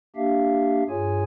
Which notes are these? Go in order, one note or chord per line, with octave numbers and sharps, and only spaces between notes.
A#3 D4 G4 E5 F5
G2 F4 G#4 C#5 G#5